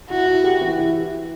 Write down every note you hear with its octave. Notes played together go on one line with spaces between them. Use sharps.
E4 F#4
E4
G4
E3
E4